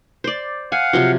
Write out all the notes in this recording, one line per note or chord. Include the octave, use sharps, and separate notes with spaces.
C5 D5
F5 F#5 G#5
C3 F3 F#3